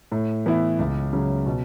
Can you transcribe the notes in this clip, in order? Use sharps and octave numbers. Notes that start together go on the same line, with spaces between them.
A2
E3 B3 E4
C#2
C#3 F#3
B2